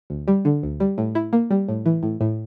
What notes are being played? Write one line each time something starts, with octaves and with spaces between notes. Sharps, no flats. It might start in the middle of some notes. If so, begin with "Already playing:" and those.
D2
G3
D3
D2
G3
A2
E4
A#3
G3
A2
E3
A2
A2